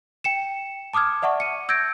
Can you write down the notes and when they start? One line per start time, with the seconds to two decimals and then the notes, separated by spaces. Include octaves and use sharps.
0.24 G5 C#7 E7
0.93 A5 D6 D#6 F6 G#6
1.22 D5 E5 F#5 A5 C#6
1.40 C#7 D#7
1.69 E6 G6 G#6 A#6 D7